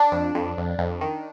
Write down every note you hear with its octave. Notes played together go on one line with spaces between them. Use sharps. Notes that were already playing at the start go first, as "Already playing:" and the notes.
Already playing: D4
F2
F2
F2
F2
D#3